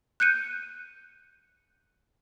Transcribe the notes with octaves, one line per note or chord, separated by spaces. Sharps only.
F#6 G6 C#7 D#7